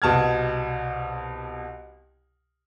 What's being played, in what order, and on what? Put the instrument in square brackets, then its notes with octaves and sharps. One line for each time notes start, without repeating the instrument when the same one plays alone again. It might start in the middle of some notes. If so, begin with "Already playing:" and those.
[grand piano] C2 B2 A5 F6 G#6